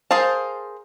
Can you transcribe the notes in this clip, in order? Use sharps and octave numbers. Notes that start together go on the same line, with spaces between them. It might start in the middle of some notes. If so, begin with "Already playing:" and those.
G#4 A#4 C5 F5 A5